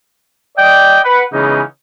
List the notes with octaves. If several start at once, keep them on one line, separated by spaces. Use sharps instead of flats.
D5 D#5 G5
B4 F#5
C#3 E3 G#3 B3 C#4 D#4